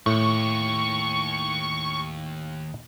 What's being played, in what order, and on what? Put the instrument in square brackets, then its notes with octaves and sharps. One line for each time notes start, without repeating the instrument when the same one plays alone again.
[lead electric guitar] D#2 [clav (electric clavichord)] A2 [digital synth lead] C#6